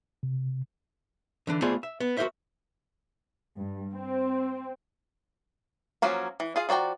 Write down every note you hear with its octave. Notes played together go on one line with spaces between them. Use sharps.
C3
D3 E3 D4
A3 B3 F4 G#4 C5 D5
E5
B3
F#4 G#4 A#4 C5 E5
G2
C4
F3 F#3 A#3 C#4 F#4
E3
F4 G#4 F5
F3 F#4 D5 G5 A#5